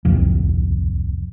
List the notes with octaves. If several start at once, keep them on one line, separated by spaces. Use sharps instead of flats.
D1 C2 F2